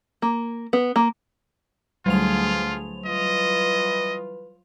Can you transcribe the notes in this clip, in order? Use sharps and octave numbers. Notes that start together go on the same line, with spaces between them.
A#3
B3
A#3
D2 F#3 G3 F4 G#4 A4 F7
E3 F4 B4 D#5